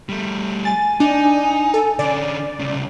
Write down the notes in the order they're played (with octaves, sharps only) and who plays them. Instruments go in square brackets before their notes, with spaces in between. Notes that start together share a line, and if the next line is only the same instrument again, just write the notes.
[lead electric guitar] G3 A3
[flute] G#5 [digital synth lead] A6
[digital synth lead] D4 [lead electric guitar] D#4
[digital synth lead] A4
[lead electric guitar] D3 C#4 [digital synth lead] D5
[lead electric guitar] C2 C#3